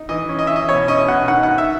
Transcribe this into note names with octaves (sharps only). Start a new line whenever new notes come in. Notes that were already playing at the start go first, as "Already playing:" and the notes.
Already playing: D#4
E3 D#5
C#4
D#5
E3 E5
D#5
B2 C#5
C#4 D#5
B2 F#5
D#3 F#5
F#5
D#4
E5